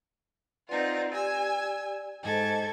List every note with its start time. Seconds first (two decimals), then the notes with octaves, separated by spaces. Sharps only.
0.69 C4 D#4 F4 B4 D5 F#5
1.13 G4 D5 G#5 E6
2.24 G#2 A4 C5 D#5 G#6